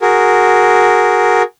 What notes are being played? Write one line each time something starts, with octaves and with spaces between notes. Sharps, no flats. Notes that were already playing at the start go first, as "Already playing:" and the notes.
F#4 G#4 A#4